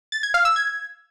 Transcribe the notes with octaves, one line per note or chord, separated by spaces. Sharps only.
A6
G#6
F5
E6
G#6